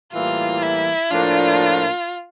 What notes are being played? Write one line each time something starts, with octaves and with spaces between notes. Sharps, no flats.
A2 E3 G3 A#3 F4
E4
A2 F3 A#3 D4 F4